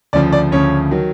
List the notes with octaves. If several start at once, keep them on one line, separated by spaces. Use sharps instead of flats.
D2 C#3 F3 D5
D5
D2 C#3 F3 C#5
D#3 F#3